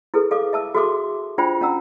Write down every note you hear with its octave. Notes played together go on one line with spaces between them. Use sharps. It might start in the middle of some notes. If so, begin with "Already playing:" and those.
E4 G#4 A4 B4
A4 F5 D6
E5 A5 E6
F#4 G#4 A4 E5 C6 D6
D4 F4 C5 G5 G#5 B5
C#4 F#5 A#5 E6